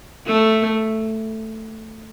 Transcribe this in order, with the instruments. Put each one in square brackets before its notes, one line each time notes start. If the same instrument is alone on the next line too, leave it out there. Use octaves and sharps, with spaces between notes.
[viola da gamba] A3